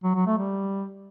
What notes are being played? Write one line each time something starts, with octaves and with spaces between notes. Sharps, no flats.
F#3
F#3
A3
G3